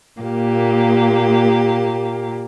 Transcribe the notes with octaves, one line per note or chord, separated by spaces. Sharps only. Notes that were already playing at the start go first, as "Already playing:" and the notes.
A#2 A#3 G4